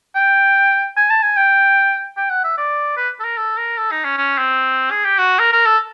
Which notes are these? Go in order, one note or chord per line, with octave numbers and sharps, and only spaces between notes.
G5
G#5
A5
G#5
G5
G5
F#5
E5
D5
B4
A4
A#4
A4
A#4
A4
D#4
C#4
C#4
C4
G#4
G4
F#4
A#4
A#4
A4